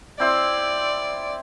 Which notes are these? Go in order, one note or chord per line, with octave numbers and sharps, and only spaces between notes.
C4 E4 C5 D5